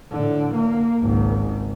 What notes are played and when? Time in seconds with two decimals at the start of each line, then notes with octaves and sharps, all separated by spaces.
0.12 A2 D3
0.55 A#3
1.00 G#1 C#2